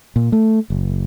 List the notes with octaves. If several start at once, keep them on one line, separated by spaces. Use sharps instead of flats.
A#2
A3
F#1